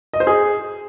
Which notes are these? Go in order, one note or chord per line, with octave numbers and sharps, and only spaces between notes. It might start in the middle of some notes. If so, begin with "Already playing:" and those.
D#5
C5
G#4